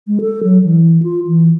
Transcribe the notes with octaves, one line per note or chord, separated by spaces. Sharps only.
G#3
A4
F#3
E3
F4
E3